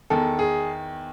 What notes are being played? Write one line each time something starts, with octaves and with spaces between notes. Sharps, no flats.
E2 D#3 A4
G#4